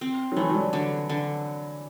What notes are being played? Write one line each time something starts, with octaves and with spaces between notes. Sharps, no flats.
C4
F#3
E3 A3
F#3
G3
D3
D3